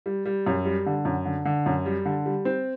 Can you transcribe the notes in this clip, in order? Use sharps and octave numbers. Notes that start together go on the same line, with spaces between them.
G3
G3
F#2
G3
D3
F#2
D3
D3
F#2
G3
D3
G3
C4